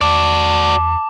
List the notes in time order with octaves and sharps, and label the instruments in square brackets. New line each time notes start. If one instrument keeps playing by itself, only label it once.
[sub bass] E2 [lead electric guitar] F#4 D5 [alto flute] A5 [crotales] D6